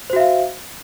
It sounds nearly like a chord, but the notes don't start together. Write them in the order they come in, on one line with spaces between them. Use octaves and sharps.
C5 F#4 E5 F5